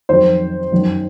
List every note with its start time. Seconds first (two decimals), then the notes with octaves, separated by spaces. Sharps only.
0.09 F2 D#3 F#3 C5
0.72 F#2 D#3 F#3